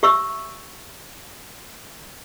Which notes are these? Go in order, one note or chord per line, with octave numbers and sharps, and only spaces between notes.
G4 E5 C#6 E6